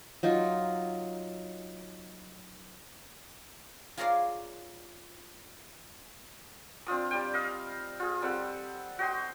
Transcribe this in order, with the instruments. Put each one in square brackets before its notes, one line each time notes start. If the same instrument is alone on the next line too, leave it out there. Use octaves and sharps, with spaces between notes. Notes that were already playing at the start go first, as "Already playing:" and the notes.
[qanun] F#3 D#4 F4
[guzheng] F4 G#4 A#4 C#5 D5 F5
[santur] C4 D4 F4 D#6
G3 D5 G5
D#5 F5
F4 G#4
G3 C4 A4 F#5
F#4 D#5 G5 C6